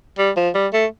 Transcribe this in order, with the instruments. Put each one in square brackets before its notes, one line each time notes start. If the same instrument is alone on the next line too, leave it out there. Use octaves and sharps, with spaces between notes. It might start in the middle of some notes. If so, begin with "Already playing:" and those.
[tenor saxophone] G3
F3
G3
A3